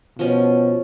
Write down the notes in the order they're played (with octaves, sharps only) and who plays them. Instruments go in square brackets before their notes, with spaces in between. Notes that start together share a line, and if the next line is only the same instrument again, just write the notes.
[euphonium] B2 [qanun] F3 C#4